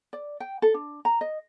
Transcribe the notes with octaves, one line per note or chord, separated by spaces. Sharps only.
D5
G5
A4
D4
A#5
D#5